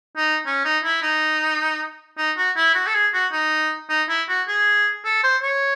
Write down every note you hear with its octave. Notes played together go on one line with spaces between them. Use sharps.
D#4
C#4
D#4
E4
D#4
D#4
F#4
E4
F#4
A4
G#4
F#4
D#4
D#4
E4
F#4
G#4
A4
C5
C#5